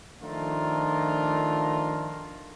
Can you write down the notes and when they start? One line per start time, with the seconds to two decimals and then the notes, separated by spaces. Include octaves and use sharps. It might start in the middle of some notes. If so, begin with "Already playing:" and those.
0.22 D#3 F3 A3 D4 F4 A#4